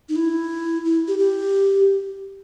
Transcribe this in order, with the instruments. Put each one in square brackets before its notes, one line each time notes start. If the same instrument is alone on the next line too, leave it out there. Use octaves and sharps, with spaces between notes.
[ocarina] D#4
E4
E4
G4
G4